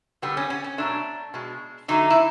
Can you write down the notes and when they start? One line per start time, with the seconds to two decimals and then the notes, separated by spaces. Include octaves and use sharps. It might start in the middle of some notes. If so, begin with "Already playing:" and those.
0.22 D3 G3 B3
0.37 C#4
0.50 C#4
0.64 C#4
0.78 B2 F#3 A3 D4
1.34 B2 G#3
1.88 D3 F#3 A3 D#4
2.10 E4